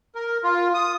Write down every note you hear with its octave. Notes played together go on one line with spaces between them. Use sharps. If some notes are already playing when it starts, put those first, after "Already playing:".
A#4
F4
D#6